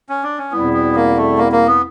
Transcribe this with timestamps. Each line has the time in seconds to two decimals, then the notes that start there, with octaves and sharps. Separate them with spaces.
0.09 C#4
0.24 D4
0.38 C#4
0.52 E2 B2 G3 B3 C4 E4
0.73 B3
0.95 A#3
1.17 A3
1.38 A#3
1.52 A#3
1.67 B3